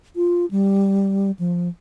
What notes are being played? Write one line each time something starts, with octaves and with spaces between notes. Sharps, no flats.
F4
G3
F3